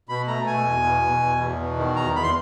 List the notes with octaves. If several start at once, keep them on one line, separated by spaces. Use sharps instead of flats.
B2 B5
A3 A#5
B2 G#5
E2
B2
B2
E2
E2
B2
D#3
E2 A#5
E2 B5
C6